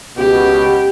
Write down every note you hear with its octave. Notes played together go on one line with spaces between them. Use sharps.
C#2 B2 G4